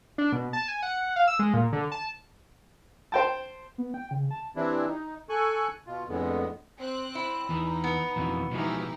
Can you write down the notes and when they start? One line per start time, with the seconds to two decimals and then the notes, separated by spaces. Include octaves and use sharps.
0.18 D4
0.32 B2
0.53 A5
0.68 G#5
0.83 F#5
1.16 F5
1.27 E6
1.39 G#3
1.54 A#2
1.73 D3
1.92 A5
3.12 C5 G5 A5
3.78 B3
3.94 G5
4.11 C#3
4.31 A5
4.56 E3 G3 C4 D4 E4
4.87 D#4
5.29 A4 G#5 C#6 F#6
5.87 B2 F4
6.08 F2 A2 D3 G#3 B3
6.78 C4 F#6
7.15 E4
7.49 E2 E3 D#4
7.84 B3
8.16 F2 B2 E3
8.52 B2 E3 F3 G#3 D#4 G4